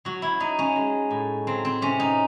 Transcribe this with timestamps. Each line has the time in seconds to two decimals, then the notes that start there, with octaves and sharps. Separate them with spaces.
0.05 F#3 F#4
0.22 E4
0.40 F#3 D#4
0.59 C#4
0.76 G#3
1.11 A2
1.47 F#3 C4
1.65 C4
1.82 C3 C#4
2.00 D#4